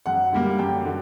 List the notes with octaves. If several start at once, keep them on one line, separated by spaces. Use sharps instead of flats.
F#2 F#5
D3 G3 A#3
F#2 G5
D3